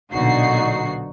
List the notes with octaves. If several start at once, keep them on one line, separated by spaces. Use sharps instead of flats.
B1 A#2 D3 D#4 F#4 C7